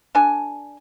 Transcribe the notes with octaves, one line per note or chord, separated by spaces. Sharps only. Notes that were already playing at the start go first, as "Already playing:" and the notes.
D4 A4 G#5